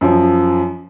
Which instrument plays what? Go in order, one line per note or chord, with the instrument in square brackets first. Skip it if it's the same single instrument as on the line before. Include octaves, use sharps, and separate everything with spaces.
[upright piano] F#2 F3